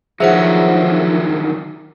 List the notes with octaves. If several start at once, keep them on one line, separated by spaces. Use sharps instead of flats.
D3 D#3 F3 F#3 G#4 C5 E5 F#5